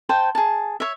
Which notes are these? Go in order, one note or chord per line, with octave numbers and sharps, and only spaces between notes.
C5 G5 A5
G#4 A5
C#5 E5